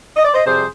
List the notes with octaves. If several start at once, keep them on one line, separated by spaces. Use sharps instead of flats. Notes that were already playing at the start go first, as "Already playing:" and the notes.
D#5
D5
C5 D#5
F2 C3 G3 G#4 C5